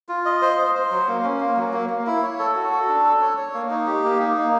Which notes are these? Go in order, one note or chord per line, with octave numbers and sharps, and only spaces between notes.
F4
D#5
C5
C5
C5
F#3
A#3
C#4
A#3
F#3
A#3
A#3
E4
C#5
A4
F#4
A4
D4
A4
C#5
C#5
A#3
D#4
G4
A#3
D#4
A#3